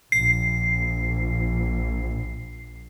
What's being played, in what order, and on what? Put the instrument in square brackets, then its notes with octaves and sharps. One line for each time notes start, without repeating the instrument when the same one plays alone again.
[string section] A#1 [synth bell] C7